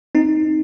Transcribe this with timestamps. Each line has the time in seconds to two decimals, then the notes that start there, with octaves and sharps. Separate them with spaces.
0.15 C4 D#4